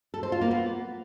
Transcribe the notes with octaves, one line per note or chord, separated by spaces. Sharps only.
A4
C5
F4
A#3
B3